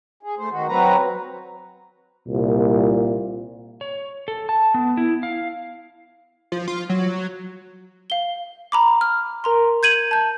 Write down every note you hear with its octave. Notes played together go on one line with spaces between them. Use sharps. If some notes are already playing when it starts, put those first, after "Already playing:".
G#4
A3 C5
D#3 F#4
F#3 C4 F#4 B4 A#5
C2 A#2
C#5
A4
A5
B3
E4
F5
F3
F4
F#3
F5 G7
A#5 B5 D6
F6
A#4 A#5 C6
G6 G#6 D#7 F#7
A5 G6